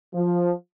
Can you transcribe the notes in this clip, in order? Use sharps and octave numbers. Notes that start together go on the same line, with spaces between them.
F3